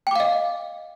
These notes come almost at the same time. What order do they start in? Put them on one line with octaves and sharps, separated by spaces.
G5 D6 F5 D#5